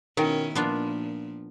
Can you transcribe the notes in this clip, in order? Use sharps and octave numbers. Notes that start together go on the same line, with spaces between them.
B2 D#3 C#4 E4 A#4 G5 G#5
A#2 F3 B3 D4 F4